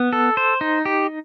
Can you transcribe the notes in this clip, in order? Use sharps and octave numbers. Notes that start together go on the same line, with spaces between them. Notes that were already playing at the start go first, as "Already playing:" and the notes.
Already playing: B3
A4
C5
D#4
G4